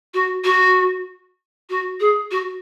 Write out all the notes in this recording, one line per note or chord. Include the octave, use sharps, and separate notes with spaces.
F#4
F#4
F#4
G#4
F#4